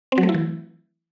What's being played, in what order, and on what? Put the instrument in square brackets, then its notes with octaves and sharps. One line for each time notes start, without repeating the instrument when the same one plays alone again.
[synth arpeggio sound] C4
F#3
A3
E4
E3